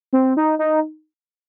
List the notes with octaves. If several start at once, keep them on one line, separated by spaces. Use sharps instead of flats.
C4
D#4
D#4